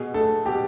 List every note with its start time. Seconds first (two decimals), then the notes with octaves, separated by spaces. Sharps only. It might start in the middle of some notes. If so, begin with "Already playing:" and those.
Already playing: B2 G#4
0.14 A3 A4
0.45 B2 G4